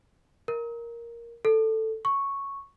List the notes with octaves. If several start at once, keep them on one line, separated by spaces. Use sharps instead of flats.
A#4
A4
C#6